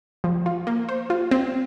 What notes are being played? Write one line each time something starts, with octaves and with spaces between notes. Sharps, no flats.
F3
F4
A#3
C5
F4
C4